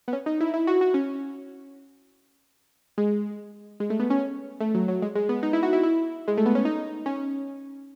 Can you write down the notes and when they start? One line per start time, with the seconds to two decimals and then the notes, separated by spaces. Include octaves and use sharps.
0.08 B3
0.13 C#4
0.26 D#4
0.40 E4
0.54 E4
0.67 F#4
0.81 F#4
0.94 C#4
2.98 G#3
3.80 G#3
3.90 A3
3.99 B3
4.10 C#4
4.60 A3
4.74 F#3
4.88 F#3
5.02 G#3
5.15 G#3
5.29 B3
5.43 D#4
5.53 E4
5.63 F#4
5.73 E4
5.83 E4
6.28 G#3
6.38 A3
6.46 B3
6.55 C#4
6.65 D#4
7.06 C#4